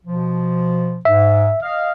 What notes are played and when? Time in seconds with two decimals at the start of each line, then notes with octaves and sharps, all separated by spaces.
0.05 B2 F3
1.05 G#2 E5
1.61 D#5 F5